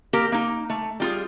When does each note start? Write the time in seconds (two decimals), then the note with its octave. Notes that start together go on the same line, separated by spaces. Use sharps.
0.13 A#3 G4 A#4 A#5
0.32 A#3 D#4
0.70 A3
1.00 G3 F4 G#4